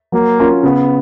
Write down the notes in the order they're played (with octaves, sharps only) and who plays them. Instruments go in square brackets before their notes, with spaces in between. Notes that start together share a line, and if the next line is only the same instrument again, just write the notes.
[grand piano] F#3 [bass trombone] A#3
[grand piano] C#4 F4 A#4
[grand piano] C#3 [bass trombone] B3